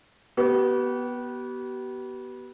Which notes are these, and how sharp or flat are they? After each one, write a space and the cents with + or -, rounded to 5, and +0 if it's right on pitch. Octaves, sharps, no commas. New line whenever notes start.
B3 -15 G4 -40